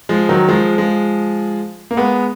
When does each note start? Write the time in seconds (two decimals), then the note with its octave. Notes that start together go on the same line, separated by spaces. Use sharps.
0.09 F3 G#3
0.29 D#3 F#3
0.49 F3 G#3
0.78 F3 G#3
1.91 A#3
1.97 G#3 B3